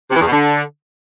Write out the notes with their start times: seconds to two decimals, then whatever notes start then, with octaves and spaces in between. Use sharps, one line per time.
0.10 C3
0.16 E3
0.21 E2
0.26 B2
0.32 D3